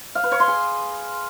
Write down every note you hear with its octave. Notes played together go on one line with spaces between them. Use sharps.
F5
B4
C#5
C6
G#4